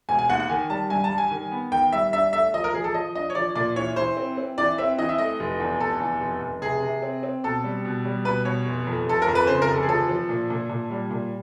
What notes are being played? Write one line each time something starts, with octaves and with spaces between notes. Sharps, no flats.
E1 G#5
G#5
D#2 F#5
F#5
D#3 G#5
G3 A5
G2 G#5
A5
G3
G#5
D#3
B3
D#3 G5
G3 E5
D4 E5
A3 E5
F3 D#5
A#4
F3 G#4
A4
F3 D#5
D4 D#5
C#5
F3 D5
A#2 D5
E3 C#5
E3 C5
C4
C4
E3 D5
C4 E5
E3 D#5
E5
A3 D#5
F1
E2
F1 A4
E2
F1
F1
C3 G#4
C3
C4
C4
B2 A4
G3
B2
G3
B2 B4
B2 C#5
F1
F2
F1 A4
A#4
F2
B4
C#3 C5
A#4
F1
A4
G#4
F3 A4
F3
A#2
A#2
A#2
G3
A#2